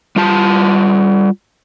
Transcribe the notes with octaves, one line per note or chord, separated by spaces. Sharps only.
G3 F4 A5